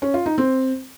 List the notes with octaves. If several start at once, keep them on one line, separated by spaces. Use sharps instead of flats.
C#4
F4
D#4
C4